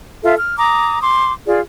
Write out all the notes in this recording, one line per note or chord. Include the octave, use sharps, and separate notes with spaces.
F4 A4 E5
F6
A#5 D6 D#6
C6 D6
F4 G#4 D5